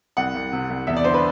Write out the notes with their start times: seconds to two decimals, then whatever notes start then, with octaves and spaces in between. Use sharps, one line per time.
0.17 C2 F#5
0.35 C2
0.52 C3
0.70 C2
0.87 E2 E5
0.96 D5
1.04 D3 C5
1.14 B4